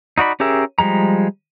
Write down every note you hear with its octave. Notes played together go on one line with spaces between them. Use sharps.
D#4 F#4 D5 B5
C#4 G4 G#4 A#4 E5
F3 G3 G#3 A#5